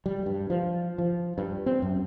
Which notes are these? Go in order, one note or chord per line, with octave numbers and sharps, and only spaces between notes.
G3
G2
F3
F3
G2
C4
F#2